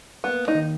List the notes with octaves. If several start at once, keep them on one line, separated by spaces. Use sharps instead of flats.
A#3 B3
D#4
D#3